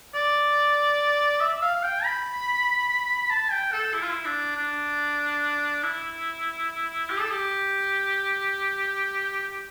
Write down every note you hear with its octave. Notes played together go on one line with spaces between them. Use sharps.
D5
E5
F5
F5
G5
B5
A5
G5
A4
E4
F4
E4
D4
D4
E4
G4
A4
G4